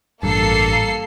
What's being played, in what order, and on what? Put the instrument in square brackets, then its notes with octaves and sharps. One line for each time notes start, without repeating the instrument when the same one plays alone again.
[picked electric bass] A1 G2 [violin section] A#3 A4 C7